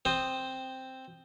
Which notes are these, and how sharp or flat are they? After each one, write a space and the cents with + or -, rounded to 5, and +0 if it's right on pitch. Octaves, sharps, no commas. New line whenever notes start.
C4 +0 C5 +0 D#6 -10